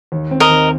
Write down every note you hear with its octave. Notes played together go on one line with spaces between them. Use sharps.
D#2
C4
A#4 D#5
D#2